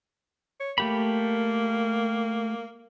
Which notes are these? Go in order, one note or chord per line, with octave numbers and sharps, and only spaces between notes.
C#5
A3 A#3 G4 B5